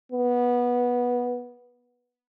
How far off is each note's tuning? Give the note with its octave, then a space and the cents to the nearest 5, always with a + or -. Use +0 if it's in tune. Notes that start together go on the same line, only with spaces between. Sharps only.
B3 -15